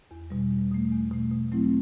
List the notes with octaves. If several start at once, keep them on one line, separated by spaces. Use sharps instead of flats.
E2
B2 G3
E2
B2 A3
E2
B2 A3
B2
F#3 A3 C4 E4